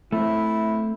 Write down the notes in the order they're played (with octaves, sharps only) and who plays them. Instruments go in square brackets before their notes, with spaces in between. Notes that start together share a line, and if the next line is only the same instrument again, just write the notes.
[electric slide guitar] A3 C4 [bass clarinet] E4